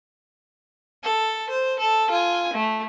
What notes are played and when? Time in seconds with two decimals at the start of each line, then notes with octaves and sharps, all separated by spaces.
1.04 A4
1.50 C5
1.79 A4
2.10 F4 G#5
2.53 A3